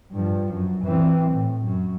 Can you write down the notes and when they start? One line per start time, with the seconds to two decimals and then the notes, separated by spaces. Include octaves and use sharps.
0.12 G2 F3
0.53 F#2
0.85 E3 C4
1.32 A2
1.65 F#2